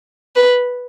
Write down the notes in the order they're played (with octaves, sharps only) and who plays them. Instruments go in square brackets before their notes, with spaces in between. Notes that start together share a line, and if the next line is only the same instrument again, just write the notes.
[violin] B4